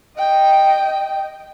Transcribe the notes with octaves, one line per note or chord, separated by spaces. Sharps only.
D#5 G5